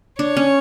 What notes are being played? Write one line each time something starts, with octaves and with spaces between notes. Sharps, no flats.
D4 C#5
C#4